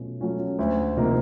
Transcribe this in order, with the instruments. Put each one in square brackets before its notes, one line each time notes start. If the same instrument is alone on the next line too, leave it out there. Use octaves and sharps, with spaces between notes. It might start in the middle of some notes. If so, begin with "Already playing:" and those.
Already playing: [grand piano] B2 F#3 A3 C#4 F4
F#3 A3 C#4 F4
D2
C3 F3 A#3 D#4